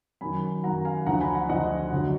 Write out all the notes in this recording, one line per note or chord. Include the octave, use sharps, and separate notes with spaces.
F#2 D#3 F#3 G#5 B5
F#2 D#3 F#3 F#5 A#5
F5 G#5
D2 D3 F3 F#5 A#5
G#5 B5
F#5 A#5
D2 D3 F3 D#5 F#5
D2 D3 F#3